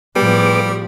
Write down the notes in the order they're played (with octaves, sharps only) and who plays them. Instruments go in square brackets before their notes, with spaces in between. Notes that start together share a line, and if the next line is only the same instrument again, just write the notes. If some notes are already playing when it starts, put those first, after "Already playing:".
[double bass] A2 F3 [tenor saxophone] G3 [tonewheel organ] B3 G#4 D6